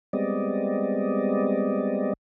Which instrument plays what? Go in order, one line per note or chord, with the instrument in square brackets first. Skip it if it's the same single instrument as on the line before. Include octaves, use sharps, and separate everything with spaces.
[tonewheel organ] G3 G#3 B3 C4 D5 D#5